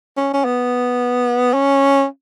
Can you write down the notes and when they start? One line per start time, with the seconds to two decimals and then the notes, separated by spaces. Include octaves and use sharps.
0.17 C#4
0.34 C#4
0.45 B3
1.54 C#4